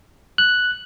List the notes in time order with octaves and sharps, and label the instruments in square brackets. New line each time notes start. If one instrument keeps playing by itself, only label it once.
[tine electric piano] F#6